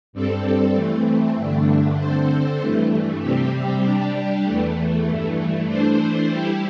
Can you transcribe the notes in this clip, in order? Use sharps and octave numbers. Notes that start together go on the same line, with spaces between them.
G2 G3 C4 A4
E3 A3 C4
G2 D3 A3 D4
D3 C4 A4 C5
G2 E3 A3
C3 G3 C4 G4
G3 D4 G4
E2 E3 A3
G2 E3 A3
E3 A3 D4 C5
G3 E4 G4